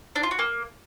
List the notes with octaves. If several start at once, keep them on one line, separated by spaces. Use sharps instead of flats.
D4
F4
F#4
A#3